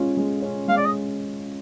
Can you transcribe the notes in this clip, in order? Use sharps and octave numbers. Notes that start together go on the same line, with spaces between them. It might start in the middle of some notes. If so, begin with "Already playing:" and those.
Already playing: G#3 C#4 F4
G#3
C#4
G#3 F5
D5
D#5